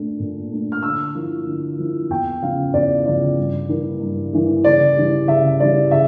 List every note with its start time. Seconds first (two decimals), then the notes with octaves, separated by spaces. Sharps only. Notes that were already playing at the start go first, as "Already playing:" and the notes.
Already playing: A#2 A3 D4
0.19 A#2
0.51 A3 D4
0.72 F6
0.83 D3 E6
1.14 F3 A#3 E4
1.46 D3
1.79 F3 A#3 E4
2.10 E2 G5
2.42 C#3 F3 C#4 F5
2.73 E2 D5
3.06 C#3 F3 C#4 D5
3.37 G2
3.69 E3 A#3 E4
4.00 G2
4.33 E3 A#3 E4
4.64 C#3 D5
4.96 E3 G3
5.28 C#3 E5
5.60 E3 G3 D5
5.91 C#3 E5